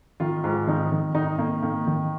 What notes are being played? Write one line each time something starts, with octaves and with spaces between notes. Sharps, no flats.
D#3 F4
G#2 F4
D#3 D#4
D#3
D#3 D#4
D#3 A#3
D#3 A#3
D#3